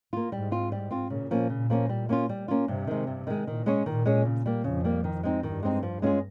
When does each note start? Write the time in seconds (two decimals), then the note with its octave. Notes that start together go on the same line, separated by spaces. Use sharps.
0.13 A#3 F4
0.32 G#2 G3
0.51 C4 F4
0.72 G3
0.91 C4 F4
1.10 A#2 C#3
1.31 F3 A#3 C#4
1.50 A#2 C#3
1.70 F3 A#3 C#4
1.89 G3
2.09 A#3 C#4 F4
2.29 G3
2.48 A#3 C#4 F4
2.68 G2 C3
2.87 D#3 G#3
3.07 G2
3.27 D#3 G#3
3.47 A#2 D#3
3.66 G#3 C#4 G#4 C#5
3.86 A#2 D#3
4.05 G#3 C#4 G#4 C#5
4.25 C#3
4.46 G3 A#3
4.64 F2 C#3
4.84 G3 A#3
5.04 D#3
5.23 G#3 C4 D#4
5.43 G2 D#3
5.63 G#3 C4 D#4
5.83 F3
6.02 G#3 C#4 F4 G#4